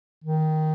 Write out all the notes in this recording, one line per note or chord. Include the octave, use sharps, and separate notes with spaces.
D#3